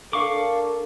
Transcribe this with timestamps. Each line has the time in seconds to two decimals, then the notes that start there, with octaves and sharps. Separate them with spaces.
0.13 D4 A4 A#4 F5 C#6 D6